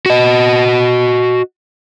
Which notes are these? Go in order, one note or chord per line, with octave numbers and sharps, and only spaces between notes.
F#4 D#5